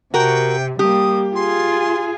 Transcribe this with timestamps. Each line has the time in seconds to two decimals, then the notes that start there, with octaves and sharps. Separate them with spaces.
0.14 C3 F#4 A#4 G5
0.79 G3 A#3 G4 D#6
1.35 F4 G#4 C6